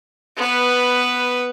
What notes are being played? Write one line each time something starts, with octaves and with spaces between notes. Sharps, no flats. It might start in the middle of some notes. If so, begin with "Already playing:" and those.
B3 B4